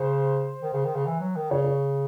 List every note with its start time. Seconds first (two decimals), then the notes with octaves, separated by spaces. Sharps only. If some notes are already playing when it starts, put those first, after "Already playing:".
Already playing: C#3 C5
0.62 D#3
0.73 C#3
0.85 D#3
0.95 C#3
1.06 E3
1.21 F#3
1.36 D#3
1.51 C#3 C#5
1.64 C#5